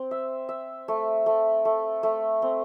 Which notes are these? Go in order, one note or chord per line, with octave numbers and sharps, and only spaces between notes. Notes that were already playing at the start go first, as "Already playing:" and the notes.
Already playing: C4
E5
E5
A3
A3
A3
A3
C4